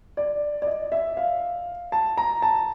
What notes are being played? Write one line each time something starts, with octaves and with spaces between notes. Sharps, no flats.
D5
D5
D#5
E5
F5
A5
A#5
A5